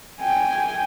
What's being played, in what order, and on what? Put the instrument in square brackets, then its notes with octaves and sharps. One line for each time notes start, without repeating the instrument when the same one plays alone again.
[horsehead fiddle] G5 G#5